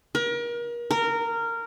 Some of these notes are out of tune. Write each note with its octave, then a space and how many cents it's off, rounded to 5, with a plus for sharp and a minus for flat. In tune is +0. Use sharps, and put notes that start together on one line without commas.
A#4 +35
A#4 -15